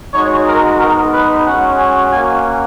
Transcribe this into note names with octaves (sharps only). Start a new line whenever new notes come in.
G#3 D#4 F#4 C#5
A#4
G#3 B3 D#4 A#4
B4
G#3 C#4 F#4 F#5
G#5
A#3 C#4 F#4 G#5